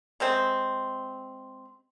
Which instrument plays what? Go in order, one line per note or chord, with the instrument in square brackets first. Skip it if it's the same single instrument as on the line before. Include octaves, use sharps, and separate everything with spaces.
[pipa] C3 G#3 C4